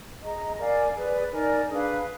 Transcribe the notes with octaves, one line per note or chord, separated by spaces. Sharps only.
G#4 D#5 A#5
A#4 D5 F5 G#5
G#4 B4 D5
D#4 A#4 D5 G#5
D4 G#4 B4 F5